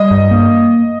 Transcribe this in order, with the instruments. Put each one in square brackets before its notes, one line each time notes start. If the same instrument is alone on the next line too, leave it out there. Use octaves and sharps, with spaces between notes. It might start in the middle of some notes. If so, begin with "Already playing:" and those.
Already playing: [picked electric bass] G3 [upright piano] D#5
[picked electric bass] G2
A#3